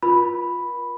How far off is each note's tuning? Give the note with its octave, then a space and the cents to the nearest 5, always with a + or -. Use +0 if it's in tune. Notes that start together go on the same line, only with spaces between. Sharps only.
F4 +15 A#4 +45 B5 +0